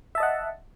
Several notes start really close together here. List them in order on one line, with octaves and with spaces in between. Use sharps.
E5 A5 D#5 F#5